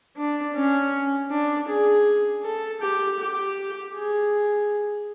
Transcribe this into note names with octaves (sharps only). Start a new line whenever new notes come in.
D4
C#4
D4
G#4
A4
G4
G4
G#4